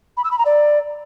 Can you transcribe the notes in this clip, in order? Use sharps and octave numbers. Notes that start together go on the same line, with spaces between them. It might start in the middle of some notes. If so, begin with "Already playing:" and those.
B5
E6
B5
A#5
D5